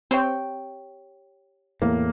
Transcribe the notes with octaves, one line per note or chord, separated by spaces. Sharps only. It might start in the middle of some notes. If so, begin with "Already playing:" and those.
C4 G4 C#5 G5
E2 A2 A#3